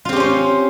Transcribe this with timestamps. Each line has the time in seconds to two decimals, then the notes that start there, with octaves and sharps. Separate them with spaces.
0.05 F4
0.09 C4
0.13 G4
0.16 C#4
0.20 C5